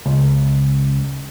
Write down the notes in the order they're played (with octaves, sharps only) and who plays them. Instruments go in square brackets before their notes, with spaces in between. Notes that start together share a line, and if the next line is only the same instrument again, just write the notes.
[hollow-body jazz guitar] C#2